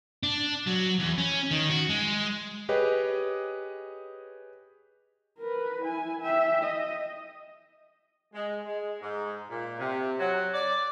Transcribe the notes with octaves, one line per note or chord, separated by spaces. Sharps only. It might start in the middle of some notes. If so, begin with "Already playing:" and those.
D4
F#3
E2
C#4
D#3
F#4
G#3
G4 G#4 B4 C#5 D#5
A#4 B4
E4 G#5
E5 G5
D#5
G#3
G#3
G#2
A#2
C3
F#3
D5